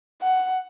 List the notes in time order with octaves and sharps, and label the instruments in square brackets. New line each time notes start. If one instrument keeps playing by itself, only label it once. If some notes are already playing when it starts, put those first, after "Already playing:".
[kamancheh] F#5